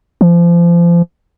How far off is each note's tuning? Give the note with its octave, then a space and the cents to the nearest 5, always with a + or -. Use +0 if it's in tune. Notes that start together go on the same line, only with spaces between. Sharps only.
F3 -30